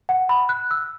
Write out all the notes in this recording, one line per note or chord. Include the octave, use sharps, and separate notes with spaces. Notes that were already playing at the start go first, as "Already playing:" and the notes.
F#5
B5
F#6
E6